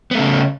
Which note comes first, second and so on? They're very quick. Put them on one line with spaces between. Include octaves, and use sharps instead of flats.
B3 A3 C#3